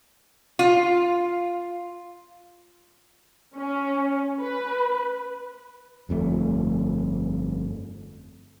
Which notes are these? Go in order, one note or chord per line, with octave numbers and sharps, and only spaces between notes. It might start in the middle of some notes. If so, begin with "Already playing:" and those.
F4
C#4
B4
G1 F2 B2 A3